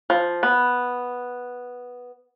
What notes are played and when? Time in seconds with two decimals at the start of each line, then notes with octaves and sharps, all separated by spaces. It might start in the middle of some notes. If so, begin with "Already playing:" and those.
0.10 F3
0.43 B3